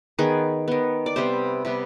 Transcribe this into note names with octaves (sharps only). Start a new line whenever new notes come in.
D#3 B3 G#4
D#3 B3
D5
C3 G3 B3 C5
C3 G3 B3